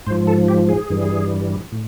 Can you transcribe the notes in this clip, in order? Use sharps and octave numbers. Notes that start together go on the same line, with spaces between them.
G#2 F3 C5
A4
G4
G#4
G2 E3 G3
A2